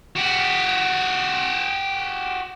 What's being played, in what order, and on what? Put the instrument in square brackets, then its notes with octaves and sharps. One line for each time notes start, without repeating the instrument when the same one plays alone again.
[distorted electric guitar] F#4 G4